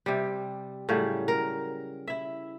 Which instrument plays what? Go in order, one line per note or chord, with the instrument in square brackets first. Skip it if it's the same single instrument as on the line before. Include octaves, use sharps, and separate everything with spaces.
[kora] C3 G3
A2 C#3 F#3 G3
A#4
E4 E5